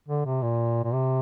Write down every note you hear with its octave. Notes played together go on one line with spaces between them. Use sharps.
D3
C3
A#2
A#2
C3